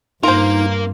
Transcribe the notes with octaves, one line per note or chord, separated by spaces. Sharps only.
G2 A#3 D#4 F4 A#4 C5